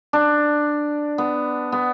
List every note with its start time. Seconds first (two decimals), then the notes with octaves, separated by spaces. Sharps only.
0.13 D4
1.18 B3
1.72 B3